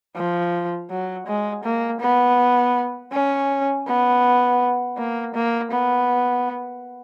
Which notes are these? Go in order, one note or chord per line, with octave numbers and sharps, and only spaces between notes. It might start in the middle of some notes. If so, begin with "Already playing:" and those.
F3
F#3
G#3
A#3
B3
C#4
B3
A#3
A#3
B3